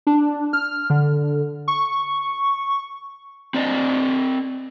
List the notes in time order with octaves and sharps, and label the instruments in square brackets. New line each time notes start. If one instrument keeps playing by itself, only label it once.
[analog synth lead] D4
F6
D3
C#6
[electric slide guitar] C4 D5 D#5